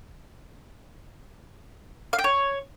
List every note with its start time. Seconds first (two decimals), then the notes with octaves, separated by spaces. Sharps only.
2.13 F5
2.19 G5
2.24 C#5